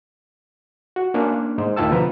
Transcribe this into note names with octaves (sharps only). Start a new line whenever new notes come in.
F#4
A#3 C#4 D4
G#2 D#4 C5
D2 D#3 F4 G5 A5 E6
B2 D3 F3 B4 A#5